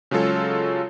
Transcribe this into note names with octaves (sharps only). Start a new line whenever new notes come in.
C#3 F#3 G#3 F4 A4 C#5